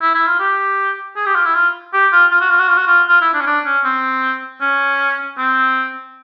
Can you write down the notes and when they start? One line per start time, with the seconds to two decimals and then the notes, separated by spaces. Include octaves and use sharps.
0.02 E4
0.15 E4
0.27 F4
0.39 G4
1.16 G#4
1.26 G4
1.35 F4
1.46 E4
1.55 F4
1.94 G4
2.12 F4
2.32 F4
2.41 F#4
2.50 F4
2.59 F#4
2.68 F4
2.77 F#4
2.87 F4
3.08 F4
3.21 E4
3.34 D4
3.41 C#4
3.47 D4
3.65 C#4
3.84 C4
4.61 C#4
5.38 C4